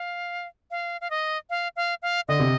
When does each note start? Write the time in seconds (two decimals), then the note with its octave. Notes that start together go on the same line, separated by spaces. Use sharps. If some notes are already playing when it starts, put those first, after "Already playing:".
Already playing: F5
0.71 F5
1.01 F5
1.10 D#5
1.50 F5
1.76 F5
2.02 F5
2.28 D3 D#5
2.40 C3